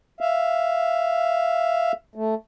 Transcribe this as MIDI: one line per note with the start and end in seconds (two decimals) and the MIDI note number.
0.21 1.92 76
0.21 1.92 77
2.16 2.35 57